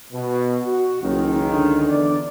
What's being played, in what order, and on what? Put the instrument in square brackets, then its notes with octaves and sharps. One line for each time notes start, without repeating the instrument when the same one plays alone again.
[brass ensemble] B2
F#4
[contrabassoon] F#1 [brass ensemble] C#2 D#3
[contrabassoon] D3
[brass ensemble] E2 D5